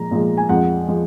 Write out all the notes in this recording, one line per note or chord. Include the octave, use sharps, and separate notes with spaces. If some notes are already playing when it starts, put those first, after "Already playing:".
Already playing: A#2 F3 G#3 A#5
A#2 F3 G#3
G#5
F2 F3 G#3 F#5
F3 G#3